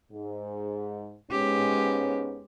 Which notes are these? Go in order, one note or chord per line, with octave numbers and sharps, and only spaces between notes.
G#2
G#2 G#3 B3 C#4 G4